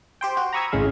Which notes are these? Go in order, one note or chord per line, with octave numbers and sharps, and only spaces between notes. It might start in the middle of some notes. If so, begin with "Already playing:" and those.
G4 C5 G5
F#4
A#5 B5 C#6 D#6 E6 G#6
G#1 A2 C#3 G#3 F5